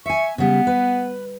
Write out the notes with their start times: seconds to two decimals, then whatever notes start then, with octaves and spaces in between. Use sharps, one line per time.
0.06 E5 G#5 C#6
0.38 C#3 G3 B3
0.67 B4